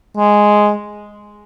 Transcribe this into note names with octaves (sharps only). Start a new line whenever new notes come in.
G#3